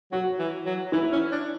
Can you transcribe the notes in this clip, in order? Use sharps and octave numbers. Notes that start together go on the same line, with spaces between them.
F#3 F#4
E3
F#3
E3 E4
C#4
D4